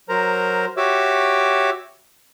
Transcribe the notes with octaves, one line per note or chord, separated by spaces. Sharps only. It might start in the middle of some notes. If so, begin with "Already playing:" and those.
F#3 A#4 C5 A#5
F#4 G4 C#5 E5 D6 E6